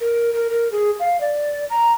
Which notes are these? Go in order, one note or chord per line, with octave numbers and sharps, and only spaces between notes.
A#4
A#4
A#4
G#4
F5
D5
A#5